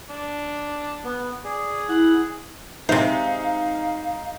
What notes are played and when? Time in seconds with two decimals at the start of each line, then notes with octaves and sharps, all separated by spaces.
0.10 D4
1.04 B3
1.44 G#4 D5
1.89 E4 F#5
2.89 C3 G#3 D#4 C5 E5 F5